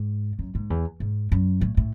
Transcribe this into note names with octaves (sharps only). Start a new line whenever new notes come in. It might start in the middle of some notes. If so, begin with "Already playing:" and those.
Already playing: G#2
F#2
G#2
E2
G#2
F#2
A2
A2